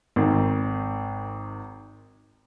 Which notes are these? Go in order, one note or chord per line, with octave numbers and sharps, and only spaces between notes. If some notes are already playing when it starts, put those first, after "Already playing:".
G#1 D#3